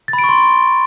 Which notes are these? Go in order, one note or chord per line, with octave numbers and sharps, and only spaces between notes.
A6
B5
D7
C#6
C6